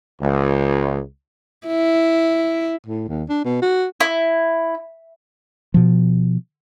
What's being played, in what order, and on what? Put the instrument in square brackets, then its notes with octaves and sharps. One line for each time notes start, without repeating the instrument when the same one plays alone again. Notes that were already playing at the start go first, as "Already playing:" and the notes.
[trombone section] C#2
[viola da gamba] E4
[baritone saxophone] A2
D#2
D4
B2
F#4
[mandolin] E4
[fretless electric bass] B2 F3